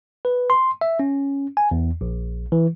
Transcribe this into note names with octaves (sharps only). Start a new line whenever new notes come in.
B4
C6
E5
C#4
G#5
E2
A#1
E3